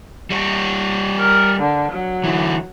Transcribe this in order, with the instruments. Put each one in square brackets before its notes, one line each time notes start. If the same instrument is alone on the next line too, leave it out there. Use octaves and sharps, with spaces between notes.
[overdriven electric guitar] G3 C#5
[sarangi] A#4
D3
F#3
[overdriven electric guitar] D3 E3